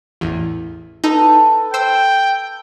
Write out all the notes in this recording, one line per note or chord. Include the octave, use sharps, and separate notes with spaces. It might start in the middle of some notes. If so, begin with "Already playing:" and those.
A1 E2
D#4 A4 B4
C5 G5 E6